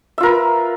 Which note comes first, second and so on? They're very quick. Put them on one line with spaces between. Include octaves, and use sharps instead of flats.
E5 F4 A#4 B4